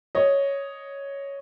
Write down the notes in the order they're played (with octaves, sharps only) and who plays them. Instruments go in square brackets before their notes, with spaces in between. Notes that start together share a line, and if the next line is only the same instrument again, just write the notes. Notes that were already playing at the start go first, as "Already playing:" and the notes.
[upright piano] C#5 D#5